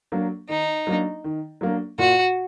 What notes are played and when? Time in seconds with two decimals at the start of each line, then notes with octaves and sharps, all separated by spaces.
0.12 F#3 A#3 D4
0.49 D#3 D#4
0.87 F#3 A#3 D4
1.24 D#3
1.61 F#3 A#3 D4
1.98 A#2 F#4